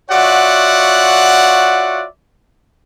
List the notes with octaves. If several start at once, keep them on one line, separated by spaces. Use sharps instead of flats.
F4 F#4 C#5 D5 E5 F#5